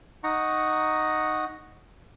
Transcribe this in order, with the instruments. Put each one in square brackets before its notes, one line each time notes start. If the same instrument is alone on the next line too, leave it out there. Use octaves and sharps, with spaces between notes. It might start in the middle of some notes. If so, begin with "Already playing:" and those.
[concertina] D#4 F#5 A#5 C#6